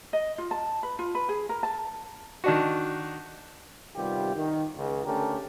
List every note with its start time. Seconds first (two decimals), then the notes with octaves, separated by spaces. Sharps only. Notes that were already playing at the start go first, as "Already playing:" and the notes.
0.13 D#5
0.38 F4
0.51 A5
0.83 B4
0.99 F4
1.15 B4
1.29 G#4
1.49 A#4
1.63 A5
2.44 D#3 D4 F#4
3.96 C3 D#3 G3 B3 F4 G4
4.35 D#3
4.76 C#2
5.05 D3 A3 C#4 G4 A4 A#4